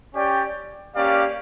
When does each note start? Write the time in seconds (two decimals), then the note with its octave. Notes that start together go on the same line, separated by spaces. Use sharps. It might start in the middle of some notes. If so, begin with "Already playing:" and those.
0.13 C#4 G4 D5 G5
0.95 A#3 C#4 G4 D5 F5